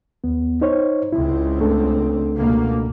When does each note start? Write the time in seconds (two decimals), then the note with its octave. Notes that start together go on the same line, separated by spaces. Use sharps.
0.24 D#2 B3
0.61 D#4 C5 C#5
1.12 C#2 C4 E4
1.61 A3 D4 A4
2.37 C#2 B2 A#3